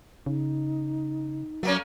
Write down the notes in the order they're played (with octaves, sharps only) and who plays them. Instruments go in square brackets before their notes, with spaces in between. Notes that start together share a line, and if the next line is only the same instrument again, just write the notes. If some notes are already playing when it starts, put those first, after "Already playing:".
[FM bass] C#3 [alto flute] D#4
[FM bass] F#3 [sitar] A3 A#3 C#4